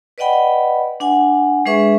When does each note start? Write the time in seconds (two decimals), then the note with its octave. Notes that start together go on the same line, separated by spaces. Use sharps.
0.18 B4 D5 D#5 F#5 G5 B5
1.00 D4 F#5 G#5
1.66 G#3 D4 G#4 B4 E5 C#6